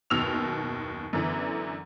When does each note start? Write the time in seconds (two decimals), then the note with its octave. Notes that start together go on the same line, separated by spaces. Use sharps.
0.10 F#1 D#2 B2 E6 F6 F7
1.13 F#2 D3 E3 B3